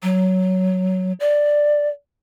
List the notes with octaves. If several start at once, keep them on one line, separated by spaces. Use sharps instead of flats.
F#3
D5